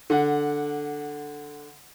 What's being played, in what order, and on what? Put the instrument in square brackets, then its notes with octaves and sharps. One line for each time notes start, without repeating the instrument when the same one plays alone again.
[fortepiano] D3 F#5